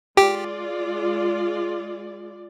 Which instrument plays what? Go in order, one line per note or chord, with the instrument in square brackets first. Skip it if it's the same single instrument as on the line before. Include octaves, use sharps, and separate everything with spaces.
[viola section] G#3 F4 D5 [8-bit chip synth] G4